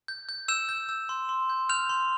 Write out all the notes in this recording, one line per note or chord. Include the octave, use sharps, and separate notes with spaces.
G6
G6
E6 G6 E7
G6
E6
C6
C6
G6
F6 G6 F7
C6